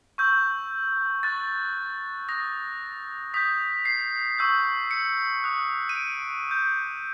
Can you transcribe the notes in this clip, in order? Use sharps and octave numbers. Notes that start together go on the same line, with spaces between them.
C#6 E6 G6
C#6 F#6 A6
D#6 F#6 A#6
D#6 G6 B6
C7
C#6 E6 G6
C#7
D#6 F#6
D#7
D7
D6 G6